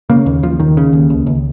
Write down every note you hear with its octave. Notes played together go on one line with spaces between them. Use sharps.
C#3 A#3
D#2
D#2 F3
D#2 D#3
C#3
D#2
C#2
C#2